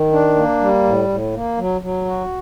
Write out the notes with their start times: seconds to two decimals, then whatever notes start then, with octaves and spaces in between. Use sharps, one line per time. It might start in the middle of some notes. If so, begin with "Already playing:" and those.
Already playing: D#3
0.12 D4
0.36 A#3
0.60 G3
0.84 A2
1.08 A2
1.33 A#3
1.57 F#3
1.81 F#3
2.05 F#4